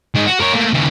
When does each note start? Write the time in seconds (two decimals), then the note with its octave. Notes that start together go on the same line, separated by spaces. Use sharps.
0.16 D#3 G#3
0.27 F#4
0.41 A#4 C#5
0.54 A3 A#3
0.74 D#2 C#3